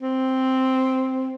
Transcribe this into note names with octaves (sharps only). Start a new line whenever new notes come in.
C4